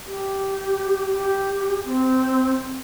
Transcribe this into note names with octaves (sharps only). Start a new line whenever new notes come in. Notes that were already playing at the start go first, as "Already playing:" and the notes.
G4
G4
C4